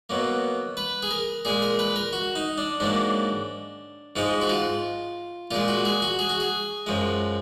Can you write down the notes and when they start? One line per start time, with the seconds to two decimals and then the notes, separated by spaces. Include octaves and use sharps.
0.10 B2 F#3 A#3
0.77 B4
1.03 G#4
1.11 A#4
1.45 A#2 G#3 G#4
1.62 A#4
1.79 B4
1.96 A#4
2.13 F#4
2.36 D#4
2.58 D4
2.80 G#2 F#3 A#3 D4
4.16 G#2 F3 G#3 D#4
4.42 F#4
4.49 F4
5.51 A#2 G#3 F4
5.68 F#4
5.85 G#4
6.02 F#4
6.19 G#4
6.29 F#4
6.40 G#4
6.86 F#2 F3 G#3